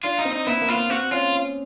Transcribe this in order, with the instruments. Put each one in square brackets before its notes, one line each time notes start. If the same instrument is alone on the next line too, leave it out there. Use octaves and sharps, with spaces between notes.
[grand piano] D4 [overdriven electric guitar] F4
[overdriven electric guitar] D#4
[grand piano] C4
[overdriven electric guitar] D#4
[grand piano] B3 [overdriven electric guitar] E4
[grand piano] A#3
[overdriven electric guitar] F4
[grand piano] B3
[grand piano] C4 [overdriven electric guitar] F#4
[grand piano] C#4 [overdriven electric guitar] F4
[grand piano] C#4